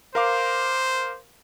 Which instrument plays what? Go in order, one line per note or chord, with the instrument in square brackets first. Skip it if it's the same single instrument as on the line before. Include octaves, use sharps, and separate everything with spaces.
[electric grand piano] A#4 F5 D6 [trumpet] C5